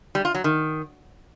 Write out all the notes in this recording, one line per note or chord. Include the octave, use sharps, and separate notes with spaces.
G3
F4
F#3
D#3